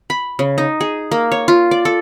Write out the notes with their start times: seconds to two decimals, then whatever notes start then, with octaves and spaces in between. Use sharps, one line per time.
0.10 B5
0.39 C#3
0.58 D#4
0.80 G#4
1.11 A#3
1.32 C#5
1.48 F4
1.71 D5
1.85 A4